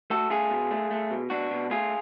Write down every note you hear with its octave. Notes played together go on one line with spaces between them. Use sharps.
A3 F#4 A4
A3 F4 G#4
B2
A3
A3
B2
B2 D4 F#4
B2
A3 F4 G#4